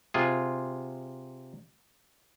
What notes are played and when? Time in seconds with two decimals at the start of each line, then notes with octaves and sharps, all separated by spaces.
0.14 C3 F4 G#4